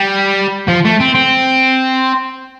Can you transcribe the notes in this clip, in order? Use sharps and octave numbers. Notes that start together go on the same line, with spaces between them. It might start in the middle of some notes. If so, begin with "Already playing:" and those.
Already playing: G3
F3
A3
C4
C4